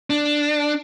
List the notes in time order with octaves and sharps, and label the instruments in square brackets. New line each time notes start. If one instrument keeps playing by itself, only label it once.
[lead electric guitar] D4